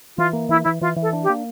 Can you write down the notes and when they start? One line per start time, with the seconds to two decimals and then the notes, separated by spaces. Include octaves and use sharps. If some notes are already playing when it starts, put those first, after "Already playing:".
0.17 E3 F4
0.33 A#3
0.49 E3 E4
0.64 E3 E4
0.81 E3 F4
0.96 E3
1.02 A4
1.13 D4
1.23 G4
1.29 A#3